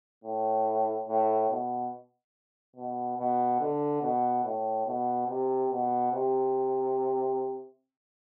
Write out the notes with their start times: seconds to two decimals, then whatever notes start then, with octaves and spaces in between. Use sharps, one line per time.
0.24 A2
1.08 A2
1.51 B2
2.76 B2
3.18 B2
3.60 D3
4.02 B2
4.44 A2
4.86 B2
5.28 C3
5.71 B2
6.13 C3